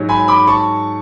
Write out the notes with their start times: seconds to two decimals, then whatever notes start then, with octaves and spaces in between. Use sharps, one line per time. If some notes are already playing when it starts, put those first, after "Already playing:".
Already playing: G#2 F#3
0.09 G#5 B5
0.28 B5 D6
0.47 A5 C#6